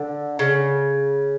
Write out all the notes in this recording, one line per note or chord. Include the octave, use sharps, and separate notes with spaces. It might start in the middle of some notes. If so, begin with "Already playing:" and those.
Already playing: D3
C#3